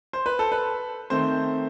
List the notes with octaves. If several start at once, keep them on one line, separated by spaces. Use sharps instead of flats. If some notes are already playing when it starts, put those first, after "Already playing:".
C5
B4
A4
B4
D#3 A3 C4 C5